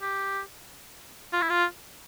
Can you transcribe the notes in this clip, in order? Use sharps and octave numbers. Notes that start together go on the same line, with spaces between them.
G4
F4
E4
F4